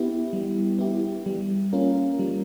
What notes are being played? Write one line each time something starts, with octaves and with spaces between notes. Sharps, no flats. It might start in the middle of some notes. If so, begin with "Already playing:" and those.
Already playing: B3 E4 G4
G3
B3 E4 G4
G3
A#3 C#4 F4 A#4
G3